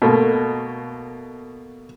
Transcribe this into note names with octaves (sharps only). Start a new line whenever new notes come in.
B2 A3 A#3